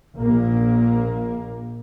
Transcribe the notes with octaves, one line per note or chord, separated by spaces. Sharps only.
A#1 A#3